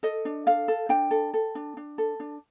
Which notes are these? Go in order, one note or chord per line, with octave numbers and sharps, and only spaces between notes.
A4 D#5
D4
A4 F5
A4
D4 G5
A4
A4
D4
D4
A4
D4